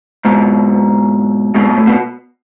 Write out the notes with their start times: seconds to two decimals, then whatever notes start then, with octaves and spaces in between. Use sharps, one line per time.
0.25 G#2 B2
1.54 G#2 B2
1.70 G#2
1.77 A2
1.87 B2